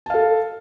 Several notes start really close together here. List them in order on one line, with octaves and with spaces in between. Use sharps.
A5 F5 A4